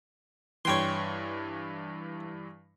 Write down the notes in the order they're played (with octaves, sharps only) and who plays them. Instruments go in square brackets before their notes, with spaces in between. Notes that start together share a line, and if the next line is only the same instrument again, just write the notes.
[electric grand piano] G2 E3 [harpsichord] C#5 G5 C6